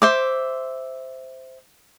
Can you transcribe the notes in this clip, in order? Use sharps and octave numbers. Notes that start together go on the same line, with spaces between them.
C5 E5 D6